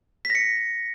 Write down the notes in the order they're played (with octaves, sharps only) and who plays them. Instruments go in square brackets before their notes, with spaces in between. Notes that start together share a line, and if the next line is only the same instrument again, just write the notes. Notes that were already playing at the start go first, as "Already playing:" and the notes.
[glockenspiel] B6
A#6
C#7